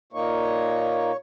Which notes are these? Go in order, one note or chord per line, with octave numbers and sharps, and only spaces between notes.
A#2 A#3 D#4 C#5